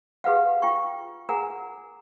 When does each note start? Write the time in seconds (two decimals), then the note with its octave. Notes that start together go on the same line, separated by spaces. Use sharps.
0.24 G4 G#4 B4 F5 F#5
0.62 F4 G5 C#6
1.29 G#4 A#4 F#5 G#5 A#5